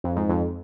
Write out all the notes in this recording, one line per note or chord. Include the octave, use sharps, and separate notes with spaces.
F2
G#2
F2